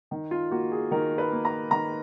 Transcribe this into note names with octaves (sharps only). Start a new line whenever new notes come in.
D#3
F4
A#3 F#4
G#4
D#3 A#4
B4
A#3
A#5
D#3 A#5